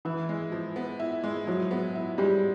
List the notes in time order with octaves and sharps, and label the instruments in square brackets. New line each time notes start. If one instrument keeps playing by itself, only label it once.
[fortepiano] E3 [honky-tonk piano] E4
[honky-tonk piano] G#3
F3
B3
E4
G#3
[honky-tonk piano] F3 [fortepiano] F#3
[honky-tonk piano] B3
E4
[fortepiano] G3 [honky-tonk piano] G#3